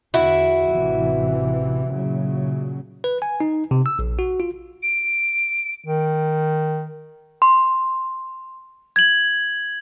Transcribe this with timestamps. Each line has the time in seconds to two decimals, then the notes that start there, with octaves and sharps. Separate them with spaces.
0.14 E2 D3 E4 F#4
0.69 A1 C3 E3
1.92 A#2 C#3 F#3
3.04 B4
3.22 G#5
3.40 D#4
3.71 C3
3.86 E6
3.99 A#1
4.19 F#4
4.40 F4
4.83 D7
5.86 D#3
7.42 C6
8.96 G#6 F#7